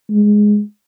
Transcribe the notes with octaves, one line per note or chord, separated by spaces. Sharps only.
G#3